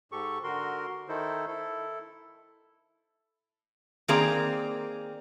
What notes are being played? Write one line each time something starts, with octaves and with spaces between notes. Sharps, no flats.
G#2 G4 A4 C#6
D3 F#4 A#4 C6
D#3 D#4 E4 A4 C5
E4 A4
D#3 A#3 C4 G#4 D5 A#5